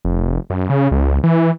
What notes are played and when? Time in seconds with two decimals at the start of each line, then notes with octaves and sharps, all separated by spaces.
0.05 F1
0.50 F#2
0.70 C#3
0.91 C#2
1.24 E3